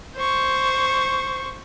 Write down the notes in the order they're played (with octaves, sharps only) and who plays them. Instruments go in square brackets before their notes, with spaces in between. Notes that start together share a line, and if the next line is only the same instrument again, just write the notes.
[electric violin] C5 C#6